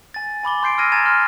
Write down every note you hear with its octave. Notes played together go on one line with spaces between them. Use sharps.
G#5 A6
G#5 B5 D6 G7
C6 G6 C7 D7
C6 E6 F6 G#6 A#6 D#7
G#5 A#5 G#6 A6 E7
C6 F6